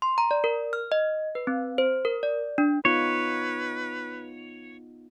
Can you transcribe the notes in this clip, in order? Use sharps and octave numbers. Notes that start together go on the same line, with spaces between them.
C6
A#5
D5
A#4
F6
D#5
B4
C4
C5
A#4
D5
D4
B3 D#4 F4 B4 C#5